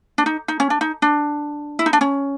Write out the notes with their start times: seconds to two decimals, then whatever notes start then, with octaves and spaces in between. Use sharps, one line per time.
0.18 D4
0.26 D#4
0.48 D#4
0.60 C#4
0.70 D4
0.81 D#4
1.02 D4
1.79 E4
1.86 D#4
1.93 D4
2.01 C#4